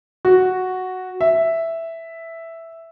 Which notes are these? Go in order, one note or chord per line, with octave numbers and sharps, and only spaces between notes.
F#4
E5